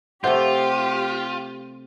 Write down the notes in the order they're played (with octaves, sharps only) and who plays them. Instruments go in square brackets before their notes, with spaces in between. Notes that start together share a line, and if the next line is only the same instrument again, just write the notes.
[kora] C3 A3 [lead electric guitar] F4 [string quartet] G4 [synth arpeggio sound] C5 F#5 G6